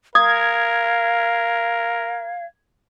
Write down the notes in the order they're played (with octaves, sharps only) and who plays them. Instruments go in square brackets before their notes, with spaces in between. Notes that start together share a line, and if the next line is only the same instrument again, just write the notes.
[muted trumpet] A#4 [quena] F5 [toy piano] D#6 [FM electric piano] G#6